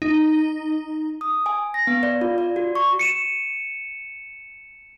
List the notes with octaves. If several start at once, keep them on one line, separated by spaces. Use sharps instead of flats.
D#4
D#6
G#5
A#6
B3
D5
F4
D5
F#4
C#6
C#7 D#7 E7